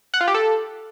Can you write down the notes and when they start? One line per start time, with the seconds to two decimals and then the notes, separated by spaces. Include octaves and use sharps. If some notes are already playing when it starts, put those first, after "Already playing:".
0.14 F#5
0.21 F4
0.27 G4
0.34 A4